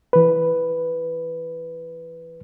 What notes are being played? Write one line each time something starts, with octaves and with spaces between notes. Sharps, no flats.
E3 B4